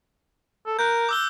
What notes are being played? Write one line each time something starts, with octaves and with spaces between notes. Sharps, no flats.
A4
A#4 F#6 G6
D6 E6 G7